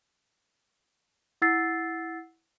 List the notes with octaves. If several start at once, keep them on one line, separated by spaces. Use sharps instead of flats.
E4 F#5 E6 A6 C7